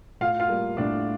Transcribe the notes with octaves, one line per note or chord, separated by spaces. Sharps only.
A2 F4 F5
F4 F5
G3 A#3
A2 D4 D5